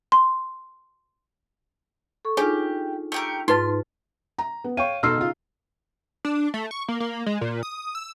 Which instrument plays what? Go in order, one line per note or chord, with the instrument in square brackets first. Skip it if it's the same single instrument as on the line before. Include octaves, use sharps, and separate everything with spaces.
[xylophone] C6
[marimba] A4 C#6
[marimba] D4 D#4 F4 [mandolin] G4 [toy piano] G#4 C#5 G#5
[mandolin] A3 G4 A#4
[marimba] G#2 F4 A6 [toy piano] D#4 B4 A5 [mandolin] C6
[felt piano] A#5
B3
[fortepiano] C#5 G5 C#6 [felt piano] F5 [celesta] D#7
[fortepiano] B2 A4 [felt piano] D#4 C6 C7 [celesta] E6 F6
[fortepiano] C#3 F4
[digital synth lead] D4
A3
C#6
A#3
A#3
G#3
A#2
D#6
E6